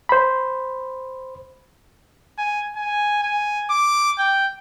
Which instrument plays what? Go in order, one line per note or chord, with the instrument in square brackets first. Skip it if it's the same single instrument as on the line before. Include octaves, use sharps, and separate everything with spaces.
[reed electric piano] C5 B5
[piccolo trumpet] G#5
G#5
G#5
D6
G5